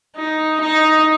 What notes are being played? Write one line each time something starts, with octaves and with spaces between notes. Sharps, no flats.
D#4
D#4